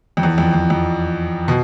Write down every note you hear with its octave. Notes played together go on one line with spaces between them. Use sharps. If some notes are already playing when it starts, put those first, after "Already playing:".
F2
E2
F2
E2
F2
B2